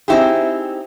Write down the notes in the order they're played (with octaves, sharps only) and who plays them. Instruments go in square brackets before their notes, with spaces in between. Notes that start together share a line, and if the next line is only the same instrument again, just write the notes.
[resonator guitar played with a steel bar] C4 D#4 E4 G4 G#4